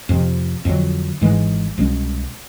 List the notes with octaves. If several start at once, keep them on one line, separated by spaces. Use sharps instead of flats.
F2 C3 F3
F2 D3 F#3
G#1 G#2 E3 G#3
C2 B2 G#3 C#4